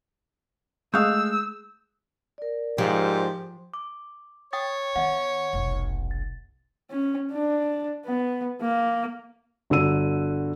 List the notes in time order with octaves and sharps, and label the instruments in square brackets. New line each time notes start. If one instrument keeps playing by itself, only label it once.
[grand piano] G#3 [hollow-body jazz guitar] A3 F5 [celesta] D#6 F#6 G6 [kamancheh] E6
[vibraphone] A#4 D5
[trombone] G#2 [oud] F3 [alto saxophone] G4
[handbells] D6
[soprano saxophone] C#5 [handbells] G5 D#6 A6
[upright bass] D#3 B3 [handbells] E5 F#5
[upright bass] F1 B1
[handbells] A6
[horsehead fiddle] C#4
D4
B3
A#3
[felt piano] G1 D3 F#4 E6 D#7